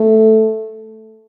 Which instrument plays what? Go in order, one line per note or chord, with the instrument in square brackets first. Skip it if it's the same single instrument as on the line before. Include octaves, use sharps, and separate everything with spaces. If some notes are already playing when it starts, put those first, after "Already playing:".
Already playing: [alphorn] A3